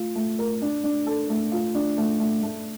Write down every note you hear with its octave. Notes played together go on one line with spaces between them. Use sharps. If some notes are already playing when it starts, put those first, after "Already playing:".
Already playing: A3 F4
A3
A#4
D4
D4
A4
A3
F4
D4
A3
A3
A3